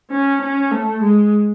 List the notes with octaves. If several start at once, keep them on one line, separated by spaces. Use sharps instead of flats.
C#4
C#4
A3
G#3